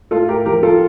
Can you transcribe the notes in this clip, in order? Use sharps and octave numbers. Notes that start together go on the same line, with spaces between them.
A2 F4 A4
G4 A#4
F3 G4 A#4
F4 A4